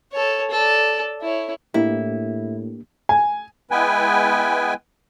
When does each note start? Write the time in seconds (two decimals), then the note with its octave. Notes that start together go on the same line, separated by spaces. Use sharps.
0.12 A4 C#5
0.51 A4 D5
1.21 E4 C#5
1.74 A2 A#3 D4 E4 G4
3.09 G#5
3.71 G#3 B3 E4 B4 G5 G#5